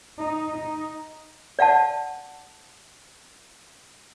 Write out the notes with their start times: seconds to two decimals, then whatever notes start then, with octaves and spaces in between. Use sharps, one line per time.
0.18 D#4
0.57 D#4
1.59 D5 F5 F#5 A5